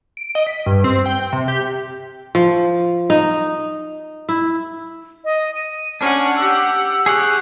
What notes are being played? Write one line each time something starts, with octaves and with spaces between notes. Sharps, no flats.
D7
D#5
B6
G2
C4
G5
C3
G4
F3
D#4
E4
D#5
D#7
C#4 D4 F#5 F6
G4 F#5 E6
G4 G#4 C#5 F#5